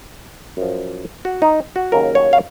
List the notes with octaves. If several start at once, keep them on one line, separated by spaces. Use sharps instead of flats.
F#2 F3
F#4
D#4
F#4
D#2 C#3 F#3 A#4
C#5
F5